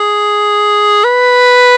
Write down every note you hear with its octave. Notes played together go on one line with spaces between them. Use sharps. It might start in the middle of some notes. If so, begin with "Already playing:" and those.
Already playing: G#4
B4